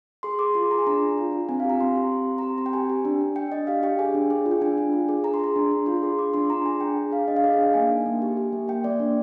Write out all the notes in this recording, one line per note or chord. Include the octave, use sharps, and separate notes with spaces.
G#4 C6
G#4 D6
F4 C6
G#4 A#5
G#5
D4 A#5
D4
F4
F4
C4 G#5
F5
G4
A#5
C4 C6
G4
C4
C4
A#5
G4 C6
C4 A#5
G5
G4 G#5
G4
D4
D4
D4 G5
D4 D#5
G4 F5
G4 G5
G#4 G#5
D4
G#4
F4
G5
D4 G#5
D4
F4
G#4
G#4 A#5
C6
G#4 A#5
D4
D4
F4 C6
G#4
F4 D6
D4 C6
D4 A#5
G#4 G#5
D4 G5
G#4
G#4 F5
D4 D#5
F5
G#4 D#5
F5
D4 G5
A#3 G#5
D#4
A#3
G4
G4
A#3
A#3 G5
A#3 D5
D4